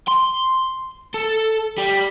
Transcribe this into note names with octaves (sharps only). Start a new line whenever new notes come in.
C6
A4
G3